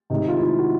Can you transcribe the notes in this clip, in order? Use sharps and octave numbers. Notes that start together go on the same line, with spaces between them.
C3 D#3 G#3 D#4
F4
E4
F#4